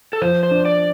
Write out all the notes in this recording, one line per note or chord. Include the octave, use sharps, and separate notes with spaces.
A4
F3 C5
C5
D4
D5